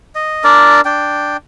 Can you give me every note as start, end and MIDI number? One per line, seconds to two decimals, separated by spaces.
0.15 0.44 75
0.44 0.81 62
0.44 0.81 70
0.44 0.81 74
0.85 1.37 62
0.85 1.37 79